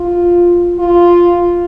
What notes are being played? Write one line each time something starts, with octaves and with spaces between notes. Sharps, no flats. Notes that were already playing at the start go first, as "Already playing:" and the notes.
Already playing: F4
F4